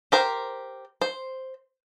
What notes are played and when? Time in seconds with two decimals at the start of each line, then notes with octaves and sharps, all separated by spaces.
0.12 G4 A#4 C5
1.01 C5